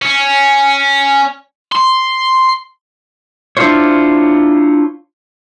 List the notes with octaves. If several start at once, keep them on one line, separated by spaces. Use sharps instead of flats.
C#4
C6
D4 E4 F4 C5 C#5